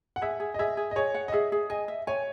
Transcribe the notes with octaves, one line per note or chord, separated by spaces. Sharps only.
F#5
G#4 E5
G#4
D#5
G#4 E5
G#4
D#5
G#4 C#5
F#5
D#5
G#4 E5
G#4
D#5 G#5
E5
C#5 G#5